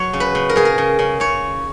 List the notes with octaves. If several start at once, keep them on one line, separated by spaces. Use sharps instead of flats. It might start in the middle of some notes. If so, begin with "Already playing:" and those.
Already playing: F#3 C#5
C#3
B4
C#3
A#4
C#3 G#4
A#4
C#3
C#3
C#3 C#5